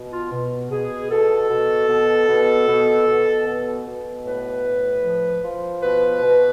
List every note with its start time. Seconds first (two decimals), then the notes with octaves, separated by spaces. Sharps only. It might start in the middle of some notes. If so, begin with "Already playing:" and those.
Already playing: B2
0.12 F4
0.32 B2
0.71 B2 G#4
1.11 B2 A4
1.50 B2
1.89 B2
2.29 B2
2.68 B2
3.07 B2
3.47 B2
3.86 B2
4.25 A2 B4
4.64 A2
5.04 F3
5.43 F3
5.83 B2 B4
6.22 B2